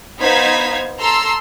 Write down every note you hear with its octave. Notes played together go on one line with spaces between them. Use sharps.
B3 D#4 C5 F5 G#6 B6
A4 A#5 C6 E6